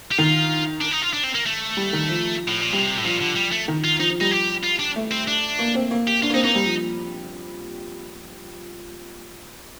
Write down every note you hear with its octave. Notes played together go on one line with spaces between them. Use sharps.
G4
D#3 F4
D4
D#4
F4
D4
C4
A#3
A3
G3
D#3
F3
A2
A#2
C3 G3
A2
A#2 F3
D3
G3
A3
D#3
F4
F3 D#4
F3
G3 D#4
G4
F4
D4
A3
C4
D4
A#3
C4
A#3
G4
D4 F4
A#3
C4 D#4
A#3 D#4
G3
F3